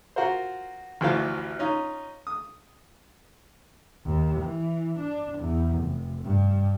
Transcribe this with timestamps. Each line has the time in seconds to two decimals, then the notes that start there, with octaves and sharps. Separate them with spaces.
0.16 F4 F#4 A#4 C5
1.01 A1 D2 E3 F3 F5 A5
1.59 C#4 D#4 F4
2.27 D#6
4.06 D#2
4.41 E3
5.00 D4
5.39 E2
5.80 F1
6.25 G2